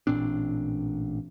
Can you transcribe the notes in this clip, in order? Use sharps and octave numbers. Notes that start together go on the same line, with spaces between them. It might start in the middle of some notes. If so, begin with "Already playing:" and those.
A1 A#2 C4 D4